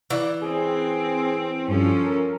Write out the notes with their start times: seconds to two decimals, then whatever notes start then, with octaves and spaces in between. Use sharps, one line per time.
0.10 E3 D5
0.41 C4 G#4
1.68 G2 F3 C#4 A4
2.05 A#4